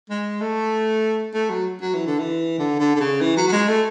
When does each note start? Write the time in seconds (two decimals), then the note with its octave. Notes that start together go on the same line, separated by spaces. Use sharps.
0.10 G#3
0.41 A3
1.34 A3
1.50 F#3
1.82 F#3
1.94 E3
2.06 D3
2.19 E3
2.59 D3
2.79 D3
2.96 D3
3.00 C#3
3.21 E3
3.37 F#3
3.47 F#3
3.53 G#3
3.68 A3